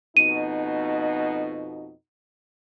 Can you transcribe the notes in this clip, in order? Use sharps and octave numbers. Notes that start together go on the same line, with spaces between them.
F2 B2 D#4 D#7